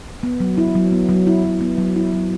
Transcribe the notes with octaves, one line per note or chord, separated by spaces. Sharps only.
B3
F#3
E4
F#3
B3
F#3
E4
F#3
B3
F#3
E4
F#3